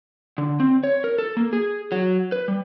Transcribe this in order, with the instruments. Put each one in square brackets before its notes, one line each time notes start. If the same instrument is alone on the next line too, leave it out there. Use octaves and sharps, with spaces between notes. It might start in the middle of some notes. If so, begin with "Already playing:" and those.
[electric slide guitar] D3
C4
C#5
A#4
A4
A#3
G#4
F#3
B4
G3